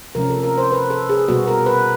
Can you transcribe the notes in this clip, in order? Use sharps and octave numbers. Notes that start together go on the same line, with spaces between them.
C3 F3 A3 C#4 A#4
A4
A#4
C5
B4
A4
G#4
B2 G3 B3 F#4
A#4
B4